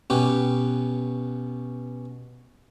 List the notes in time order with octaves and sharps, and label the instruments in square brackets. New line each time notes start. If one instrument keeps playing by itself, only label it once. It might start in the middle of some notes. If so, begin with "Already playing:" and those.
[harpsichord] B2 C#4 G4 B4